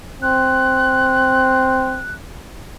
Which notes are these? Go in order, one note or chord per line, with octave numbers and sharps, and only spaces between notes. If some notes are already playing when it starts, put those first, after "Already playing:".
C4 F#6